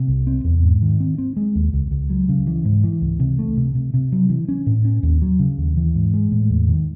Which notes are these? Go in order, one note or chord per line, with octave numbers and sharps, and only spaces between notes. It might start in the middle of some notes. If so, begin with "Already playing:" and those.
Already playing: C3
C2
C4
E2
G#2
D#3
C4
C4
G#3
D#2
C#2
C#2
F#3
C#3
E3
G#2
E3
C#2
C3
A3
C3
C3
C3
F#3
E3
C#4
A2
C#4
D#2
F#3
C#3
D#2
E3
G#2
G#3
A2
E2
D#3